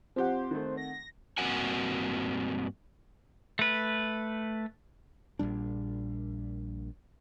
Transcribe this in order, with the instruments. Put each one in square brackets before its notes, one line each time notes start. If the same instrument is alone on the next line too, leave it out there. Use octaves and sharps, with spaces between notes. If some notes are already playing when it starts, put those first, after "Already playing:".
[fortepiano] F3 G4 [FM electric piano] C4 F#5 [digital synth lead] C5
[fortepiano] D#3 A3
[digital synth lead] A#6
[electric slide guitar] G2 A#3 C4 F#4 F#5 G#5
[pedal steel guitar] A3 B4
[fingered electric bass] A#1 A#2 G3 D4